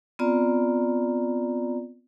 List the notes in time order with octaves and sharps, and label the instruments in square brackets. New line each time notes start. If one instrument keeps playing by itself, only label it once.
[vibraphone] B3 C4 F4 D5 A#5